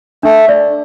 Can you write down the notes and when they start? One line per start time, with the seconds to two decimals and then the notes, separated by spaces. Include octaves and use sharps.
0.23 A3 D4
0.49 D5